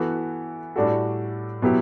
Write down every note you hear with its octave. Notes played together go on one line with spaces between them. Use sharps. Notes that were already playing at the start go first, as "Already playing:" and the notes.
Already playing: E3 B3 F#4 A4
A2 G3 D4 F#4 A4
B2 F#3 B3 E4 G4